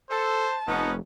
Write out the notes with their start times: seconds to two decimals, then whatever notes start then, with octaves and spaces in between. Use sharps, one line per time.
0.10 A4 C5 A5
0.68 F1 B3 C#4 D#4